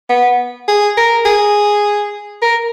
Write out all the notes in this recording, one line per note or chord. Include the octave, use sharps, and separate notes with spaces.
B3
G#4
A#4
G#4
A#4